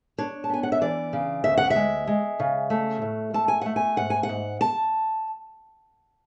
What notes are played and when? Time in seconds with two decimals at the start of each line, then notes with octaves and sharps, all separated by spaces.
0.18 D4 C#5
0.44 A5
0.49 B3 G#5
0.63 F#5
0.72 E5
0.81 E3 D5
1.13 C#3
1.44 D2 E5
1.58 F#5
1.70 E5
1.76 G#3
2.07 G#3
2.40 C#3
2.70 A3
3.02 A2
3.34 A3 A5
3.48 G#5
3.61 A3 F#5
3.76 G#5
3.96 G#2 F#5
4.10 G#5
4.23 F#5
4.29 G#2
4.61 A5